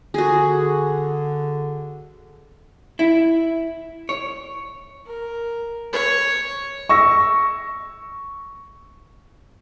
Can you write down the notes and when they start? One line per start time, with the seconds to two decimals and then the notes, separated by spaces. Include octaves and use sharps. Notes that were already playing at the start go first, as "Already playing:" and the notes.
0.14 D3 F#4 G#4
2.99 E4
4.09 C#5
5.06 A#4
5.93 C#5
6.89 C#6 E6 A#6